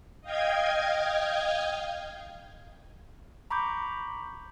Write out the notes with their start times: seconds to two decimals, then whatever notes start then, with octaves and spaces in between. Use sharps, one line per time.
0.21 D#5 F5 G5 G#6
3.50 A#5 B5 C#6 D6 G6